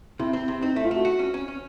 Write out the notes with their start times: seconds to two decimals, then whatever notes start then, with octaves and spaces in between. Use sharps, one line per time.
0.19 C3 E4
0.33 C4
0.48 C3
0.62 C4 D#4
0.73 E4
0.76 A3
0.84 F4
0.91 A3 F#4
1.05 F#4
1.19 C#4
1.34 C#4
1.48 C#4